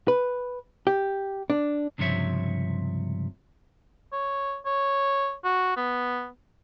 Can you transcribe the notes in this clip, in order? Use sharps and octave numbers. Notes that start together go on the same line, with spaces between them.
B4
G4
D4
C#2 G2 C3 F3 C#5 E5
C#5
C#5
F#4
B3